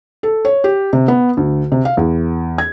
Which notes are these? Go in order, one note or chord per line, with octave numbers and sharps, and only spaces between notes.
A4
C#5
G4
C3
B3
D2
C3
F5
E2
G#6